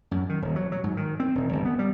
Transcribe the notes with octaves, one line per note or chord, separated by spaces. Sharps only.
F#2
D#3
D#1
F#3
F#3
G#2
D#3
C4
E1
G1
B3
G3